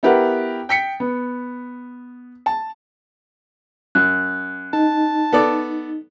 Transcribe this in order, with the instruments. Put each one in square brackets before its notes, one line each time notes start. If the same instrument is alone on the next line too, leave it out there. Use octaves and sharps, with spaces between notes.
[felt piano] B3 E4 G4 A#4 B4 F#5
G5 B6 C#7
B3
A5
[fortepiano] F#2 [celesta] F#6
[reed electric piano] D#4 [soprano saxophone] A5
[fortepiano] B3 A4 D5